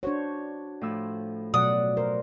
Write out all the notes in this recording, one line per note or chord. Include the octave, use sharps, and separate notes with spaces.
D4 F#4 C5 C#5
A2 F3 E6
B2 F#3 D5 F#5 D#6
A#4 C5